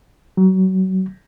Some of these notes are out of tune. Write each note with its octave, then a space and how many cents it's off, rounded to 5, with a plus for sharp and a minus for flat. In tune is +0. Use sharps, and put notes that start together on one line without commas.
F#3 +30